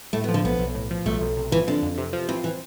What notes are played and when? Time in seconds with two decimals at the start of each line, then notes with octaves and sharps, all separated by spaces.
0.13 A2 A3
0.24 B3
0.29 F3
0.34 D3
0.44 B1 B3
0.59 B1
0.75 A2
0.91 F3
1.06 B1 A3
1.21 B1
1.37 C3
1.52 E3 F3
1.67 D3 C4
1.82 F2
1.98 C3
2.13 F3
2.29 E3 C4
2.44 E3